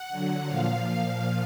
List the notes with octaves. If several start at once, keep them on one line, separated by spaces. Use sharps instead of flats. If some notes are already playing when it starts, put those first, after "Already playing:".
Already playing: F#5
D3 F#3
A#2 F3 F5
A#2 F3